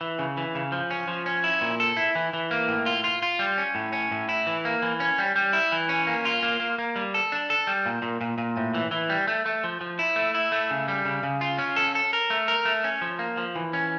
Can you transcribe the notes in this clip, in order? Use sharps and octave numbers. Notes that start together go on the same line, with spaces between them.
E3
C#3
E3
C#3
F3
C#4
F3
C#4
E4
A#2
A4
E4
E3
E3
A#3
A2
F4
F4
F4
G3
C#4
A2
C#4
A2
E4
E3
A#3
E3
C#4
G3
G3
E4
E3
C#4
A#3
F4
A#3
A#3
A#3
G3
A4
D4
A4
G3
A#2
A#2
A#2
A#2
A2
E3
E3
G3
A3
A3
F3
F3
E4
A3
E4
A3
C#3
G3
C#3
C#3
F4
C#4
A4
A4
A#4
A3
A#4
A3
C#4
F3
A#3
F3
E3
C#4